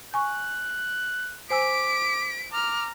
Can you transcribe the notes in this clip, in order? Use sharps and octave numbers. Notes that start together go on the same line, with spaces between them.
G#5 C#6 F#6
C5 G#5 D6 E6 B6 D7
A#5 D6 F6